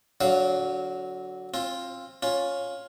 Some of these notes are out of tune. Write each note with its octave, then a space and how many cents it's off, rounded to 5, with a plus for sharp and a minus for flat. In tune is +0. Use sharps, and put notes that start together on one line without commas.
D3 -25 F#3 +0 F5 -10
C4 +25 F4 +0
C#4 +0 F4 +10